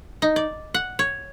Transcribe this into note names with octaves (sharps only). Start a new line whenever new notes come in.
D#4
D5
F#5
C#5